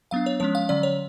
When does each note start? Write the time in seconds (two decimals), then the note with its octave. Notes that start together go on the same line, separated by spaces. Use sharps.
0.11 F#3 B3 D4 F5
0.26 C#5
0.40 F3 G#3 C#4 C#5
0.55 F5
0.69 D3 F#3 C#4 D5
0.83 C#5